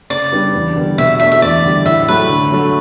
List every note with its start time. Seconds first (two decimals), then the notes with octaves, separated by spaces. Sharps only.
0.10 C#3 D5
0.32 G3 B3 D4
0.54 E2
0.76 D3 G3 B3
0.98 B2 E5
1.20 A3 D4 F#4 E5
1.32 E5
1.42 E2 D5
1.64 D3 G3
1.85 A2 E5
2.08 F#3 A3 B4
2.29 D3
2.51 F#3 A3